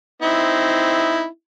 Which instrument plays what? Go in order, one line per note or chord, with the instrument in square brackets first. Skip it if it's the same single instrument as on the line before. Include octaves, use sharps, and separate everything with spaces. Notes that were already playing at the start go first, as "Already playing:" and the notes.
[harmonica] C4 D#4 E4